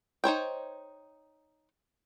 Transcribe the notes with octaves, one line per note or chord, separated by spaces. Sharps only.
D#4 C5 C#5 G5